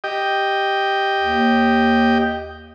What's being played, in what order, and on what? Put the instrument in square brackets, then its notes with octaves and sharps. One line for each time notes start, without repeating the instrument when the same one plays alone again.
[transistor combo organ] G4 D#5 G5
[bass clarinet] D#2